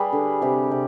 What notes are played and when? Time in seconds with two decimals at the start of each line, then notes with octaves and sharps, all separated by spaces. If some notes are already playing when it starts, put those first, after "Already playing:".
Already playing: G3 G#4 B4
0.13 D3
0.42 C3 G4
0.71 C3